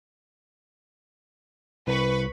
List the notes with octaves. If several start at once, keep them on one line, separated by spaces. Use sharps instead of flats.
C2 B4 B5 C#6